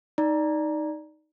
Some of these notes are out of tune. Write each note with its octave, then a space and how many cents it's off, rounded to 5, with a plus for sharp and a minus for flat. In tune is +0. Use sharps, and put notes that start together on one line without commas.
D#4 +0 D5 +0 A#5 +10